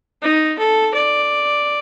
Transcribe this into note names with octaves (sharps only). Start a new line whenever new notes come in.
D#4
A4
D5